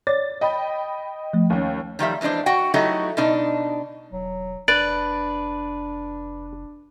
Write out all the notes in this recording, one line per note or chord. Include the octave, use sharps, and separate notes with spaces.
C#5 D5 D6 A6
D#5 G5 B5
F3 A3
D#2 C#4
D#3 F3 G3 E5
E2 E3 G#3 D4 C5
F#4 F#5 G5
F#3 A3 D#4 E4 F#4 G4
B2 D4 D#4
E1 F#3
F1 D4 B4 D5